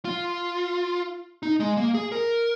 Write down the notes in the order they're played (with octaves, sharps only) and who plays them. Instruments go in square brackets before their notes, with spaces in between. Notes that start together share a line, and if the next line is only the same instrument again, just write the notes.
[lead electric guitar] F4
D#4
G#3
A#3
G#4
A#4